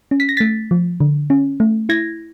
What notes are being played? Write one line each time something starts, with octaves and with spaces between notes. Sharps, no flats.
C#4
B6
A#6
A3 A6 B6
F3
D3
C#4
A3
E4 G#6 A#6